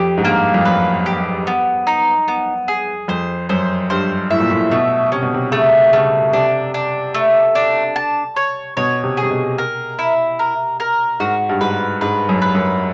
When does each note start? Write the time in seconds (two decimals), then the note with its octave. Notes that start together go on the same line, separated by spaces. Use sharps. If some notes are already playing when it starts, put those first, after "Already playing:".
Already playing: F2 G4
0.17 G#2
0.24 G2 A#3
0.54 F2
0.65 F#2 B4
1.06 G4
1.47 B3
1.87 D#4
2.28 B3
2.68 G#4
3.08 F2 C5
3.49 F#2 C5
3.90 G2 C5
4.30 A2 E5
4.40 A#2
4.50 A2
4.71 B2 A3
5.12 C3 C#4
5.22 B2
5.34 C3
5.52 C#3 A3
5.93 C#3 A3
6.33 C3 D4
6.74 D4
7.14 A3
7.55 D4
7.96 A5
8.36 C#5
8.77 B2 C#5
9.03 C3
9.17 G#4
9.23 C3
9.31 B2
9.58 A#4
9.99 E4
10.39 A#4
10.80 A#4
11.20 G#2 F#4
11.49 G2
11.61 G#2 B4
12.01 G#2 B4
12.29 F#2
12.42 B4
12.55 F#2